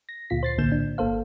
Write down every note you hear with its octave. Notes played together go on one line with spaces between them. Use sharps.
A#6
D2 A#2 F4 B6
C5 A6 C7
B1 A2 D3 A#3 G6 E7
D4
G1 A#3 A4 C5 F5